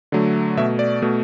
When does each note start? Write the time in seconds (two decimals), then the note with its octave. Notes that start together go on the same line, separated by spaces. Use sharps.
0.12 D3 F#3 A3
0.57 B2 A3 E5
0.79 D5
1.02 B2 A3